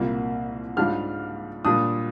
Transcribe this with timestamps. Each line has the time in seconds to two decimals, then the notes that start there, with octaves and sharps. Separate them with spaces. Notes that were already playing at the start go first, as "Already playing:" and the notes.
Already playing: C2 A#2 G3 A#3 F4
0.77 G#2 G3 D4 F4 F6
1.65 A#2 G3 D4 D#6